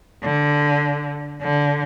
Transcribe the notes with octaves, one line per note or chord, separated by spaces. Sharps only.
D3
D3